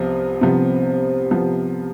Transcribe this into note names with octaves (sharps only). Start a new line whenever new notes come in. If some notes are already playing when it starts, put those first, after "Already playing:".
Already playing: C2 C3 F3 B3
C2 C3 F3 B3
C3 F3 B3